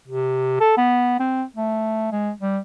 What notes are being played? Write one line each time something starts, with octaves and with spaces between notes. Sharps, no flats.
C3
A4
B3
C4
A3
G#3
G3